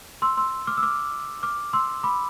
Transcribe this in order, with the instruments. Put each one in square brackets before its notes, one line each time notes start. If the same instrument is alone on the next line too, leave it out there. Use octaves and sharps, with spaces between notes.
[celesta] C6 E6
C6 E6
D6 F6
E6
D6 F6
D6 F6
C6 E6
B5 D6